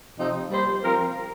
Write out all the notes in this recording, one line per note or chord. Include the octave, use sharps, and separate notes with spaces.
C3 F3 C4 D#4
G3 A#3 G4 C5
F3 C4 F4 A#4